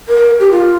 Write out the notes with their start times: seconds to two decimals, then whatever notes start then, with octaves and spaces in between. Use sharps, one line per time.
0.09 A#4
0.40 G4
0.51 F4